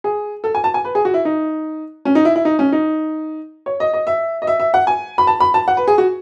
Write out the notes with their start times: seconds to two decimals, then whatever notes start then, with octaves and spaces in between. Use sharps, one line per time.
0.04 G#4
0.44 A4
0.55 G#5
0.64 A5
0.74 G#5
0.85 B4
0.95 G#4
1.05 F#4
1.14 E4
1.25 D#4
2.05 C#4
2.15 D#4
2.25 E4
2.36 E4
2.45 D#4
2.59 C#4
2.72 D#4
3.66 C#5
3.80 D#5
3.93 D#5
4.07 E5
4.42 D#5
4.47 E5
4.60 E5
4.74 F#5
4.87 G#5
5.18 B5
5.27 A5
5.40 B5
5.54 A5
5.68 F#5
5.77 B4
5.87 G#4
5.98 F#4